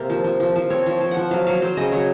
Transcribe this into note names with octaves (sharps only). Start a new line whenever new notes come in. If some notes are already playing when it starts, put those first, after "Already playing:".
Already playing: C3 A#3 F5
F3
F3
F3
F3
C4 C#5
F3
F3
F#5
F3
F#3 F5
F#3 F5
F#3 C5
C#3 D#5
F#3 C#5